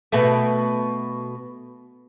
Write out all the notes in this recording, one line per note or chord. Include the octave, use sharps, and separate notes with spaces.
B2 A3